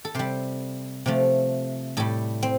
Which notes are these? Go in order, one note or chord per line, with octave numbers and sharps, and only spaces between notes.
A4
C3 G3 C5
C3 F3 A3
A2 G3 A4
C4